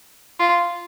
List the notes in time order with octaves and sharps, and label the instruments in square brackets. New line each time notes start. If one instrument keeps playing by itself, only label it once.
[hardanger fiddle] F4